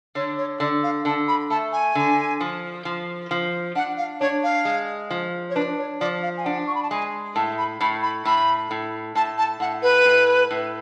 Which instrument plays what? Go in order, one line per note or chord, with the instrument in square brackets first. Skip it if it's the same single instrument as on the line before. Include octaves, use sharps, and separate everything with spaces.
[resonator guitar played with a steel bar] D3 [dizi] C#5
[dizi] C#5
[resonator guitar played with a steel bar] D3 [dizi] D5
[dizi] F5
[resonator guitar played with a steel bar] D3 [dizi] A5
[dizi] B5
[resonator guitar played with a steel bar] A3 [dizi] A5
[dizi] G#5
[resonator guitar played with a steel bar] D3
F3
F3
F3
[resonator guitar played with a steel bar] D4 [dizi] F#5
[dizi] F5
[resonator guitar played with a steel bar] D4 [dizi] C#5
[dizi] F5
[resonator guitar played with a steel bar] G#3
F3
[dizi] C#5
[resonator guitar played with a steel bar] D4 [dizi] B4
[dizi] C#5
[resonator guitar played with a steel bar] F3 [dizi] D5
[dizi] F5
G#5
[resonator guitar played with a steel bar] D4 [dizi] F#5
[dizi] C#6
B5
A5
[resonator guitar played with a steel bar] G#3 [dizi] G#5
[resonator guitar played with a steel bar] A2 [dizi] A5
[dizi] B5
[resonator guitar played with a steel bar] A2 [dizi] B5
[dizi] B5
[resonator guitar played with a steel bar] A2 [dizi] B5
[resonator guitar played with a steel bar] A2
[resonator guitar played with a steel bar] A2 [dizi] A5
[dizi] A5
[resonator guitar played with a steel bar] A2 [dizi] F#5
[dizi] B4
[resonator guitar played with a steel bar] A2
A2